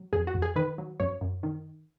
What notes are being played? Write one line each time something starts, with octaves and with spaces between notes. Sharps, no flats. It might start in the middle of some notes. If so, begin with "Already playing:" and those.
Already playing: F#3
F2 G#4
F#4
F2
G#4
D#3 B4
F#3
F#2 C#5
F#2
D#3